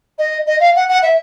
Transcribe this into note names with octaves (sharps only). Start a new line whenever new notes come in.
D#5
D#5
F5
F#5
F#5
E5